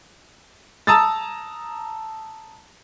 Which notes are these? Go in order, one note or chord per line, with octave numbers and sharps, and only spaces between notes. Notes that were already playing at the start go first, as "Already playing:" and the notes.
A5 A#5 D#6 E6 A6